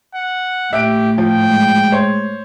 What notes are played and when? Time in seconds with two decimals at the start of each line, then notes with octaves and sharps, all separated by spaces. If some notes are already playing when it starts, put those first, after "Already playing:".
0.15 F#5
0.73 A2 G4 E5 F#6 D7
1.18 F3 G5
1.50 G#3
1.92 C5 C#5